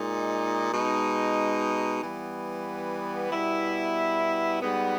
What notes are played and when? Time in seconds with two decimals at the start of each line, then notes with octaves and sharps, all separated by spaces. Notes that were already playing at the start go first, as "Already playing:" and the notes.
Already playing: A#2 G#3 D#4
0.72 B2 G#3 D#4
2.02 E3 G3 B3
3.32 B2 G3 B3 E4
4.62 G#2 G3 B3